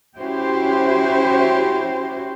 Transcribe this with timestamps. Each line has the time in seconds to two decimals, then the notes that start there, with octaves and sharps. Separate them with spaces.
0.18 C#4 E4 F#4 G4 C5